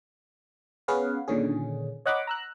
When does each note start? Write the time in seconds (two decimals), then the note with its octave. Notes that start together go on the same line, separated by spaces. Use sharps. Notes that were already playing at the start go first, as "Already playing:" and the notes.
0.88 B3 C#4 G#4 B4 F5 F#5
1.28 A#2 D3 D#3 C#4 G#4
2.06 C#5 D#5 F#5 A#5 B5 D6
2.27 A#5 E6 F#6